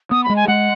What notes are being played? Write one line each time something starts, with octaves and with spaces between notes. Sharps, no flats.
B3 D#6
B5
G#3
G#5
G#3 F#5